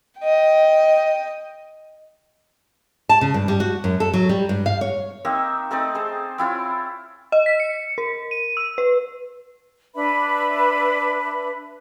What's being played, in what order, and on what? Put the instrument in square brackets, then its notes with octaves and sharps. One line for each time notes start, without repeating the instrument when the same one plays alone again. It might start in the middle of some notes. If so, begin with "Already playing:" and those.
[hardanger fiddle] D#5 G5
[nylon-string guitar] A5
C#3
G2
G3
F#4
F#2
A4
F#3
G3
G2
F5
C#5
[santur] A#3 C4 D#4 E5
A3 C4 D#4 D5
G#4 C5 A5
C4 E4 F4 C#5
[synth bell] D#5
B6
C#7
A#4
D#7
E6
B4
[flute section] D4 B4 E5 B5